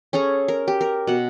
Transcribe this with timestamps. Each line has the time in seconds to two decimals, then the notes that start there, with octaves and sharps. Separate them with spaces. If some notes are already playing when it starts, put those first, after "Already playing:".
0.13 C#4 G#4 A4 A#5
0.48 A#4
0.68 G4
0.81 A#4
1.07 B2 F#5